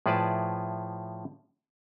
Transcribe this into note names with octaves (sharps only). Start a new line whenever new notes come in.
A2 F3 G#4 B4 D5 A5